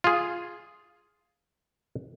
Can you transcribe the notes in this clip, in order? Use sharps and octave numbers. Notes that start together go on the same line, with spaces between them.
F4 G#4